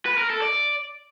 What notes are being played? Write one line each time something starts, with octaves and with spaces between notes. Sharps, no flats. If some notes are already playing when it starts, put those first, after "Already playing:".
B4
A#4
A4
D5